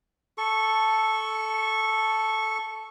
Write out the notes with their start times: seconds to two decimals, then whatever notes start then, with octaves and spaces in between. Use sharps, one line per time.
0.38 A4 C#6